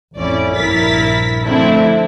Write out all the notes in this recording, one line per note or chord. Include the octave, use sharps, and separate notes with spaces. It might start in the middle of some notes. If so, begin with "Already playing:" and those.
A1 F2 C#4 E4 D5
A#1 G2 E4 A#4 A6 B6
D3 F3 A3 C4 D4 E4